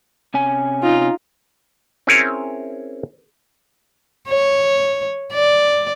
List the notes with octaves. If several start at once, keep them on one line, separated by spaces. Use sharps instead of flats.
C3 C#4 G#5
D#4 F4
C4 C#4 E4 G#4 A#4 C#5
C#5
D5